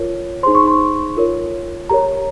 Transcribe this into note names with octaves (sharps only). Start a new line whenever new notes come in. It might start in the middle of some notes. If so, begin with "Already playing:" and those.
Already playing: F4 A#4 C#5
D#4 G#4 C5 C6
C#6
C6
F4 A#4 C#5
G4 A#4 C#5 A#5